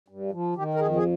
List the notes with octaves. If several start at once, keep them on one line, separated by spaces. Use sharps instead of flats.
G2
F3
D#3 G4
A#4
F2 G#4
G#4